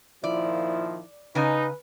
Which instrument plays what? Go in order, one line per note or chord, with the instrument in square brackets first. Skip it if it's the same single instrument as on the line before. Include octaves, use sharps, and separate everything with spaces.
[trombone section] A#2 D#3 F3 [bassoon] E4 [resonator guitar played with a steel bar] D5
[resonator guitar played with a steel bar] C#3 G#5 [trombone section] D#4 [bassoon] B4